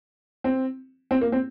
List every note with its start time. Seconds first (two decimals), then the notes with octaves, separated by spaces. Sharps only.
0.44 C4
1.11 C4
1.21 A#3
1.32 C4